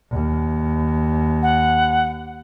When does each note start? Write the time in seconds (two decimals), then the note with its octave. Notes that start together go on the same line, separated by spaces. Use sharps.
0.11 D#2
1.43 F#5